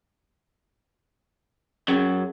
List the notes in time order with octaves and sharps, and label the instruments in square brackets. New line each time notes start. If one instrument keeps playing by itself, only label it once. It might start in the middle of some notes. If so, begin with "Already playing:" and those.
[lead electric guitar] F#2 F#3 [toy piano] C#4 G#4